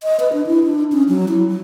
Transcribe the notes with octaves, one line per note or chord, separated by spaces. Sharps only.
D#5
B4
D4
E4
D4
C#4
F#3
E4
F#3